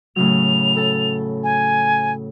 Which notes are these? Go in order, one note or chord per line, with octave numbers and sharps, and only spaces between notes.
A2 C#3 F#3 F7
A4 A5
G#5